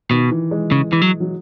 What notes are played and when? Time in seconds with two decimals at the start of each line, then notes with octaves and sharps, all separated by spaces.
0.11 B2 D#3
0.31 E3
0.51 G#3
0.72 C#3
0.93 E3
1.02 F#3
1.20 F#3